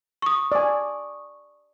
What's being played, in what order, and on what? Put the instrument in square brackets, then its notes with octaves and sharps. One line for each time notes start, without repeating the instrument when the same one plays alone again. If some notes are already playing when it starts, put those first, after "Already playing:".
[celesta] C#6 D#6
[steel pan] D5 G#5